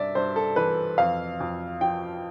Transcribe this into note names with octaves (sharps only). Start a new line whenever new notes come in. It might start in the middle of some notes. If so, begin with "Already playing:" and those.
Already playing: G2 D5 E5
G2 C5
A4
E3 B4
F2 F5
F2
F3 G5